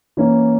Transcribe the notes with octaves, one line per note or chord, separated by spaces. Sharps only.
E3 A#3 C#4